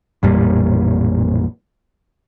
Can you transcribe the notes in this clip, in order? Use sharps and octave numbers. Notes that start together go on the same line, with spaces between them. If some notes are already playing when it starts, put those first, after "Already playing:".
A1 F2 A#2 G3